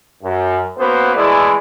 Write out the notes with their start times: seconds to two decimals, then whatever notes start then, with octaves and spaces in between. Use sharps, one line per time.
0.23 F#2
0.79 A#3 B3 C#4 F#4 B4 C5
1.16 E3 G#3 A3 E4 G#4 D5